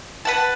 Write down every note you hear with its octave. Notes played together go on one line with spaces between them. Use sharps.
B4 F#5 A5